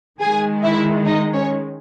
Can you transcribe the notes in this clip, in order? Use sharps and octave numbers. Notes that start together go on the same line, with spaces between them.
D#3 G#3 G#4 G#5
E4 E5
D#4 D#5
C#4 C#5